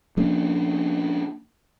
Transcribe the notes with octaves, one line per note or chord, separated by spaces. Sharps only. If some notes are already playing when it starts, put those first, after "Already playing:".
F3 A#3 C#4 D4